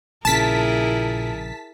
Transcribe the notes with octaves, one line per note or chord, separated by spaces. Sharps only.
A#1 A#2 C#3 E4 G#4 A#4 A5 B6